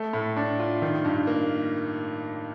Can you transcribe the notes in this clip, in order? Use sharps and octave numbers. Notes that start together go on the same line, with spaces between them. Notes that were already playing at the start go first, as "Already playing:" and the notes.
Already playing: A3
A2
D4
F4
D#3
G2
A#3